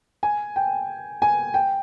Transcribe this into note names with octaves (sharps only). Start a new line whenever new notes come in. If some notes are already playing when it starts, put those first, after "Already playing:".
G#5
G5
G#5
G5